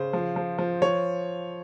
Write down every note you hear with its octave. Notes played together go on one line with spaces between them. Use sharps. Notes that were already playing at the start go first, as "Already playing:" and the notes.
Already playing: C#3 C5
F3
F3
F3
F3 C#5